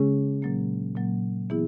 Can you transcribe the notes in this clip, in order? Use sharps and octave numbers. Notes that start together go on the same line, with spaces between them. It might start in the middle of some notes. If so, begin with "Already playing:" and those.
Already playing: C#3 G#3 C#4 G#4
A#2 F#3 A#3
A#2 F#3 A#3
E3 B3 E4 G#4